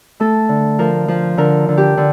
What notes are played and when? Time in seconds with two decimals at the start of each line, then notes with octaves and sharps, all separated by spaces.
0.20 A3 A4
0.49 D3
0.79 F3 A#4
1.08 F3
1.38 D3 A#4
1.68 D3
1.77 G4
1.98 D3